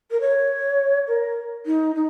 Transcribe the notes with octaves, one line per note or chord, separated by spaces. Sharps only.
A#4
C#5
A#4
D#4
D#4